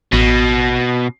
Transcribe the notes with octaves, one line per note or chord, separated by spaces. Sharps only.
A1 B2